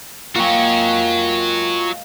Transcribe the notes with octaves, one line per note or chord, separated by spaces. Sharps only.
G#3 A#3 F4 F#4 C#5 G5